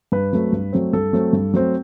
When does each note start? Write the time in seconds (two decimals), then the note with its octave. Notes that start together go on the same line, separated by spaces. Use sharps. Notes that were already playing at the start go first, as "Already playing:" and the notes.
0.12 G2 B4
0.33 F#3 A3 C4
0.53 G2
0.73 F#3 A3 C4
0.93 G2 A4
1.13 F#3 A3 C4
1.33 G2
1.53 F#3 A3 C4